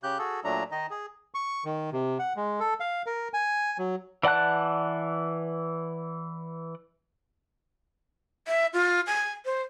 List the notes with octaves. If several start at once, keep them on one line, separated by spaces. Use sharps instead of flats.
C#3 G4 F#6 G6
F#4 G#4 A4
A#2 F#3 A3 D4 A#5
D#3 D#4 D#5
G#4
C#6
D#3
C3
F#5
G#3
A4
F5
A#4
G#5
F#3
E3 D5 F#5 A5 F#6
E5
F4
G#5
C5